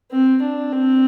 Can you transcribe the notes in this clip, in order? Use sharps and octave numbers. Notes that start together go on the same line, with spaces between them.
C4
D4
C4